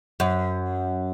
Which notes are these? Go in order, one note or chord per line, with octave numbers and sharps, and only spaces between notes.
F#2